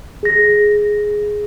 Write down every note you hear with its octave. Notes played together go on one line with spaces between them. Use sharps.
G#4 A#6